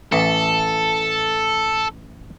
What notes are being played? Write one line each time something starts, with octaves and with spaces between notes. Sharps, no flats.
A1 E3 A4